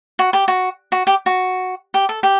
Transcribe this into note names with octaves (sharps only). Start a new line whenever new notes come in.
F#4
G4
F#4
F#4
G4
F#4
G4
A4
G4